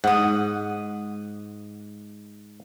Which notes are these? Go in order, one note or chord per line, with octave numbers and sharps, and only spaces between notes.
G#2 F#5 D#6